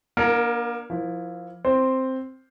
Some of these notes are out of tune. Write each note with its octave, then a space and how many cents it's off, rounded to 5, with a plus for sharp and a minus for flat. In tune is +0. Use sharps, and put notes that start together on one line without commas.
A#3 +40 D4 +0 A#4 +0
F3 +10 E4 +0 A#4 +40
C4 +0 C5 +0